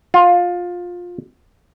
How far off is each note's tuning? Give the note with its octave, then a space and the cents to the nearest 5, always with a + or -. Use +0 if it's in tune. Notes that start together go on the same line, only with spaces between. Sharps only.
F4 +20